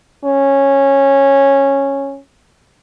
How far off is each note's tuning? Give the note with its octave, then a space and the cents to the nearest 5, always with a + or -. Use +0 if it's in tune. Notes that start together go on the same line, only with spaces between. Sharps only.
C#4 -10